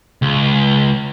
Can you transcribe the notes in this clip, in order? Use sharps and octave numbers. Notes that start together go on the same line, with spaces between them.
C#2